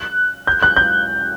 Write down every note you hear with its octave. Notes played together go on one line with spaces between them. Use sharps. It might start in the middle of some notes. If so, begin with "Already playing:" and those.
Already playing: F#6
G6
F#6
G6